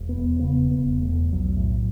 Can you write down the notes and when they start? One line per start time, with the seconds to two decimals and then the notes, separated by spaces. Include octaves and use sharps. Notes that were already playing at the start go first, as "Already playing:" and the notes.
Already playing: E1
0.09 B3
0.18 E2
0.40 C#3 B3
0.63 E1
0.71 B3
0.86 E1
1.02 A3
1.09 E2
1.32 B1 F#3
1.56 A2